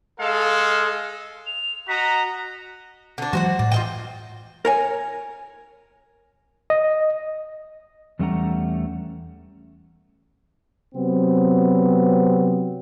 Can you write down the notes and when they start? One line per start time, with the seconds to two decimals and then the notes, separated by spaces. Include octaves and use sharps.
0.20 G#3 A4 F5
1.47 F7
1.88 F#4 D#5 A#5 B6
3.18 D3 D4
3.33 E3 F#3 G#3 F#4 C5 F#5
3.59 A2 D4
3.72 F4 D#5 G5
4.65 A#4 C#5 G#5
6.70 D#5
8.19 E2 G3 A3 C#4 F#5 A#5
10.95 C3 F#3 B3 C4